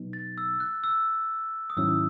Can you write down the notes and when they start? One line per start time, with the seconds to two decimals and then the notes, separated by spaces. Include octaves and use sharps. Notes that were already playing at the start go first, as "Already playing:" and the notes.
Already playing: B2 F#3 B3 D#4
0.13 A6
0.38 E6
0.60 F#6
0.84 E6
1.70 D#6
1.77 G#2 D#3 F#3 C#4 E4 E6